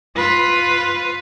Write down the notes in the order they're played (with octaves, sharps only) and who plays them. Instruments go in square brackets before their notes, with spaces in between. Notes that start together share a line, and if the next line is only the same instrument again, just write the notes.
[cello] F4 B4